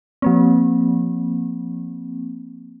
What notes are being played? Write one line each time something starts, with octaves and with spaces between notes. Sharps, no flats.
F3 A#3 C4